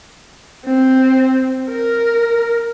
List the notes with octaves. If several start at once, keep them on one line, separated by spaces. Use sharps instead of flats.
C4
A#4